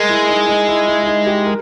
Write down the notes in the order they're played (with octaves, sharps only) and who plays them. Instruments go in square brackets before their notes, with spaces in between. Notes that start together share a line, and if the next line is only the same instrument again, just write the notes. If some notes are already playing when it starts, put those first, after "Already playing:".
Already playing: [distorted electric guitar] G#3 [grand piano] A#4
[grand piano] E4
D#4
D#4
E4
E4
E4
D#4
G4
A#4